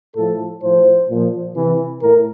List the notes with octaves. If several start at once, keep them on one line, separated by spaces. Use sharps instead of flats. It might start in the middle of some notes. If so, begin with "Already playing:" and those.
A2 F3 A4
A2 F3 C5
A#2
F3
C3 E3
A2 A#4